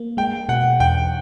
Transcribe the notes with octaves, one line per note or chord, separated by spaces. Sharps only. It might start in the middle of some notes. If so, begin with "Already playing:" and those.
Already playing: A#3
G#3 G5
B2 F#5
E2 G5